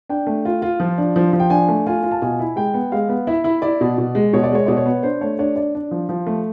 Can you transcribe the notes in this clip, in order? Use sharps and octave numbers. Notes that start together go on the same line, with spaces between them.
D4 G5
A3
F4
F4
F3
D4
F3
F3
G5
D4 G#5
A3
F4 G#5
F4
A5
B2 G#5
E4
G#3 G5
B3
G#3 F5
B3
E4 E5
E4
E4 D5
B2
B2
G#3
B2 C#5
D5
G#3 C#5
B2 D5
C#5
B3
D4 C5
A3 C#5
D4 C#5
D4 D5
D4
F3
F3
A3